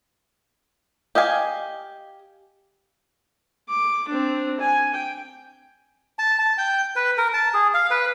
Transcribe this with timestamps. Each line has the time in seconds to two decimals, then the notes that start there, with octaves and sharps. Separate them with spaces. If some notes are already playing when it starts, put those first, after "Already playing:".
1.15 G4 D#5 F5 G#5
3.69 D6
4.08 C4 D4
4.60 G#5
4.94 G5
6.19 A5
6.39 A5
6.58 G5
6.96 B4
7.18 A#4
7.33 A5
7.54 G#4
7.74 F5
7.90 B4